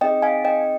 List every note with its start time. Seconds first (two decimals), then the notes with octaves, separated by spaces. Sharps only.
0.01 C4 D#4 G#4 D#5 G5
0.22 F5 G#5
0.45 D#5 G5